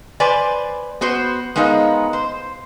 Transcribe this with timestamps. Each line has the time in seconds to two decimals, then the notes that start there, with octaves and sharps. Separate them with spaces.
0.20 B4 C5 D5 G#5
1.01 B3 F#4 C5
1.56 G#3 B3 D#4 A#4 F5
2.13 C5